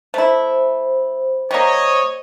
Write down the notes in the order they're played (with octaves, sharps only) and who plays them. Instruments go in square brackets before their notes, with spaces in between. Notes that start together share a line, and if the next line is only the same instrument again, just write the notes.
[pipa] A3 E4 [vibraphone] C5
[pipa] G3 A#3 [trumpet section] C#5 D#5